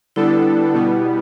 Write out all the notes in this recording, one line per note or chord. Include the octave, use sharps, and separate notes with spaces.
D3 G3 B3 D4 E4 A4
B2 G3 B3